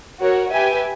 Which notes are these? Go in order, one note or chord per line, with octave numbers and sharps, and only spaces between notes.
F#4 A#4 C#5
G4 B4 E5 G#5